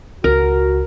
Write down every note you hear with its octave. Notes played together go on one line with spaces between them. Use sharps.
C#2 F#4 A#4